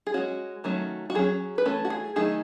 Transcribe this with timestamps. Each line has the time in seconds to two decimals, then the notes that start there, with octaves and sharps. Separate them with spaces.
0.07 G#4
0.14 G#3 C#4 F#4
0.64 D#3 F#3 A3 C#4
1.10 F#4
1.15 F#3 C#4 G#4
1.58 B4
1.65 E3 A3 C#4 A4
1.85 F#4
1.90 G#4
2.16 D#3 F#3 A3 D#4 G#4